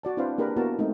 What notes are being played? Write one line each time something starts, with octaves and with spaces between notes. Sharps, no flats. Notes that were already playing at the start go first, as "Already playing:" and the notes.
F#4 D5 A5
C4 D4 E4 B4 C5 F5
A#3 D4 G4 G#4 A#4 B4
A#3 B3 E4 F#4 A#4 A5
G#3 A3 C4 D#4